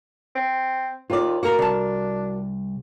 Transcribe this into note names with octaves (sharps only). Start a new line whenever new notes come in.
C4
D#2 F4 D5
A#3 F#4 A#4
C2 D4 A5